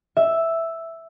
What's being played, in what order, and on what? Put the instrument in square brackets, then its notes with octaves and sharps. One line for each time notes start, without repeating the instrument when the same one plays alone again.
[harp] E5